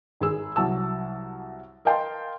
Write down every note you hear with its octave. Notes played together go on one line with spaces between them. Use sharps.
G#1 G#4 E6
C2 F#3 A5 E6
A#4 D#5 F5 G5 A5 C6